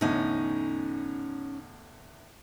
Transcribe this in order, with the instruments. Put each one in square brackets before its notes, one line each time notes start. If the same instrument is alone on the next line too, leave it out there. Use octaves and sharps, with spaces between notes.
[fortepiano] E2 A2 D3 [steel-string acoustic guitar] C#4 D#4